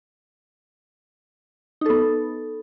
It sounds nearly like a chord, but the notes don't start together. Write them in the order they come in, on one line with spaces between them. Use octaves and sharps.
D#4 A4 B3